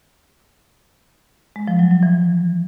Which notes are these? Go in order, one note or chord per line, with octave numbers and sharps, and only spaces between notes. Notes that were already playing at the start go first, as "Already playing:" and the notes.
G#3
F3
F#3
F#3
E3